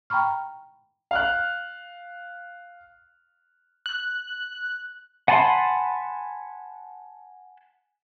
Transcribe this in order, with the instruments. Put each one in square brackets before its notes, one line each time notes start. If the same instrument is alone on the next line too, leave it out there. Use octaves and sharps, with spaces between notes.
[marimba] G5 A#5 B5 C#6 F6
[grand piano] F5 F6 F#6
[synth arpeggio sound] F#6
[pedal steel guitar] F#5 G#5 A5 B5 C6